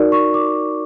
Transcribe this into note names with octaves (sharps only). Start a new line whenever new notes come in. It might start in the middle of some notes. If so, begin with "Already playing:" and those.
Already playing: D#4 F#4 A#4 D5
C#6
D6